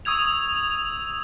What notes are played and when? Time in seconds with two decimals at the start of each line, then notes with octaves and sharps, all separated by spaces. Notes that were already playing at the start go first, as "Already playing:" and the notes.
0.05 C#6 D#6 E6 G#6 F7